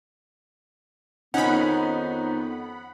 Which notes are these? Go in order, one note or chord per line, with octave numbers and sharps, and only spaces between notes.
F2 D#3 B3 C#4 D#4 F#5 B5